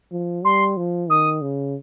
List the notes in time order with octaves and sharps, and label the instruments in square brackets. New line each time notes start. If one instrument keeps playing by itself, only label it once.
[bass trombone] F3
[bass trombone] G3 [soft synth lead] C6
[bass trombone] F3
[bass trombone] D#3 [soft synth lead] D#6
[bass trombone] C#3